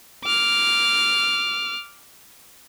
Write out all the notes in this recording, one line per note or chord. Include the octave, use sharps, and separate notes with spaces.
D6 F6